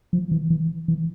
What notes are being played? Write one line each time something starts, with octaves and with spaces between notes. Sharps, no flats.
F3
E3
E3
E3